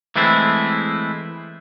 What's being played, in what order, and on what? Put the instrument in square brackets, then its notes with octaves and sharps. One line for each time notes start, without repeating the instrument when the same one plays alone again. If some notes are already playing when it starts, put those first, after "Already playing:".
[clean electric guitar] E3 G#3 A3 C4 E4